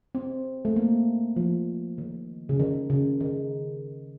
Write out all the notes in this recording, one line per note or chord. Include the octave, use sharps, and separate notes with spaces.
C4
A3
A#3
F3
D#3
C#3
D#3
C#3
D#3